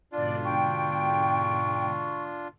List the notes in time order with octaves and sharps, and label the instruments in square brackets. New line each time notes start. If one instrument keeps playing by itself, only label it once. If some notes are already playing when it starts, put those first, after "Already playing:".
[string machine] G#2 B2 D3 [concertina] D4 F4 [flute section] D5
[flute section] G5 [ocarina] C#6